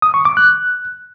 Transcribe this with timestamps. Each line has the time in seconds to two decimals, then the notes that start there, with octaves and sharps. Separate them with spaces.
0.02 D#6
0.14 C#6
0.25 D6
0.37 F#6